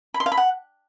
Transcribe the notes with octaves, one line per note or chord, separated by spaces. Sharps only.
B5
C6
F5
B5
F#5